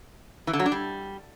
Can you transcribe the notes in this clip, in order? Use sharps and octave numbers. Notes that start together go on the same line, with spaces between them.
E3
D3
F#3
D4
G3